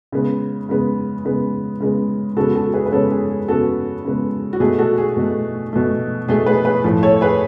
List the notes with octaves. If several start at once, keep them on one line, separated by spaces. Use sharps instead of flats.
C#3 G#3 B3
C#3 G#3 B3
C#3 G#3 B3
C#3 G#3 B3
C#3 G#3 B3 F#4 A4
F#4 A4
G#4 B4
B4
C#3 G#3 B3 A4 C#5
G#4
G#4
C#3 G#3 B3 F#4 A4
C#3 G#3 B3
F#4
B2 A3 G#4
F#4 A4
G#4
B2 A3
B2 A3
B2 A3 G#4
G#4 B4
G#4 B4
A2 F3 A3
A4 C#5
G#4 B4